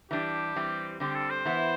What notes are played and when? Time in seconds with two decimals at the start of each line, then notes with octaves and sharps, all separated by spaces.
0.11 E3 G3 D4 G4
0.56 E3 G3 C4
1.00 D3 G3 C4 G4
1.15 A4
1.30 C5
1.45 E3 B3 E4